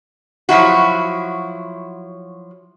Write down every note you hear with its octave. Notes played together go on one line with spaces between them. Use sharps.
F3 F#3 E4 F#4